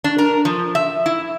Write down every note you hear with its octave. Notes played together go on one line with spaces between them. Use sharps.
D4
A#4
F3
E5
E4